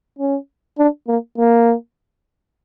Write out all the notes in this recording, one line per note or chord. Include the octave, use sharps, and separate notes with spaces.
C#4
D4
A#3
A#3